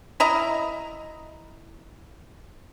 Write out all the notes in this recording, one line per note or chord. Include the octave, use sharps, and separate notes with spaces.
E4 D#5 A#5